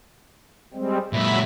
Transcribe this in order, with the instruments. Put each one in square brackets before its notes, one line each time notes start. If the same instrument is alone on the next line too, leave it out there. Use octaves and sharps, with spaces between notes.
[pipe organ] G3 G#3 C4
[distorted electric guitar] A#2 G#3 [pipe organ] F#3 E5 B5